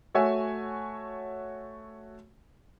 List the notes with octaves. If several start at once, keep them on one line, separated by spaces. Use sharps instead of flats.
A3 F#4 C#5 E5 G#5